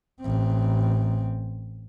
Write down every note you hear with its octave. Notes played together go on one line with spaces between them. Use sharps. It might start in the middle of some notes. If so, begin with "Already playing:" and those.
A1 C4